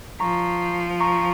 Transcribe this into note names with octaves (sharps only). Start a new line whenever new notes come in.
F3 A#5 C#6
A#5 C#6